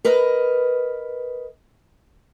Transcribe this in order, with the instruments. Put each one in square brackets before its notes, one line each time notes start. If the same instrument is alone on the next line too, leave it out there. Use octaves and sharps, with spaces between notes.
[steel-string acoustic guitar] A#4 B4 D#5